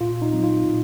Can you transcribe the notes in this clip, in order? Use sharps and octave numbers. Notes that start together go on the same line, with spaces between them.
A#2 F4
D#4
F#3 C4
F4
A#2